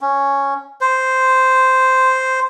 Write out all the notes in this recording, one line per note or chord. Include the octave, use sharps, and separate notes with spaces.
C#4
C5